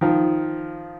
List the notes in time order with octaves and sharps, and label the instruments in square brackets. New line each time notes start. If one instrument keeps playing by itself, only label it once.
[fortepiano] D#3 F3